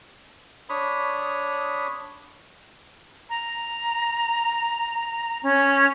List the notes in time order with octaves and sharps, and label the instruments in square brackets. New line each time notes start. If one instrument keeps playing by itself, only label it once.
[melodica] D4 C#5 B5 D#6
[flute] A#5
C#4